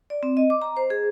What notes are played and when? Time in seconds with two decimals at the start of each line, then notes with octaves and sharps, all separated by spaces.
0.10 D5
0.23 C4
0.37 D#5
0.50 D6
0.62 A#5
0.77 C5
0.90 G#4